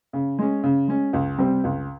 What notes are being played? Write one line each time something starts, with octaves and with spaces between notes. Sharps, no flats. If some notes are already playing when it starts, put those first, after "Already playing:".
C#3
G#3 C#4
C#3
G#3 C#4
C#2
C3 G3 C4 G4
C#2